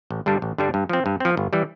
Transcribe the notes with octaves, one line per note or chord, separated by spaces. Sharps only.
A1
G2 D3 G3 D4
A1
G2 D3 G3 D4
G2
F3 C4
G2
F3 C4
G1
E3 G3